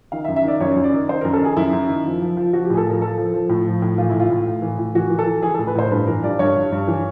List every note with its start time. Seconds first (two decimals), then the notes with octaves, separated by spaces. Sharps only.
0.12 D#3 F5
0.24 E5
0.28 F#2
0.36 E5
0.44 D#3 D5
0.60 F#2 C#5
0.76 F#2
0.84 D5
0.92 D#3
1.09 D#3 C5
1.21 F#2 A#4
1.33 A4
1.41 D#3 G#4
1.56 F#2 E4
1.73 F#2
1.89 D#3
2.06 F3
2.22 F3
2.37 F3
2.53 F3 F#4
2.65 G4
2.70 A2 G#4
2.77 A4
2.85 F3 A#4
3.02 F3 A4
3.17 F3
3.34 F3
3.49 A2
3.66 F3
3.82 A2
3.98 E3 F4
4.10 A2 E4
4.20 F4
4.30 A2
4.47 A2
4.62 E3
4.78 A2
4.95 E3 F#4
5.10 E3
5.19 A4
5.26 E3
5.42 E3 G#4
5.54 A4
5.59 A2
5.67 B4
5.75 A2 C5
5.91 G2 B4
6.07 E3 A#4
6.23 G2 D5
6.39 G2 C#5
6.56 G2
6.72 G2
6.87 E3